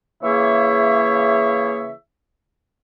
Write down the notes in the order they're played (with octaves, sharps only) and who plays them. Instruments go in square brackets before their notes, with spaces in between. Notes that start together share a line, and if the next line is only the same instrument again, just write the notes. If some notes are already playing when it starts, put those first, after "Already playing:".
[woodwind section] C#3 E3 A#3 G#4 C#5 E5